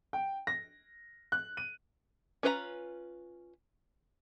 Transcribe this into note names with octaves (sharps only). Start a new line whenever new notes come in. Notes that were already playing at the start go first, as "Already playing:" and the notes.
G5
A#6
F#6
D#7
C#4 F4 B4 C5 A#5